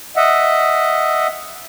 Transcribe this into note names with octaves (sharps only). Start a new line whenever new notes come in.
D#5 E5 F#5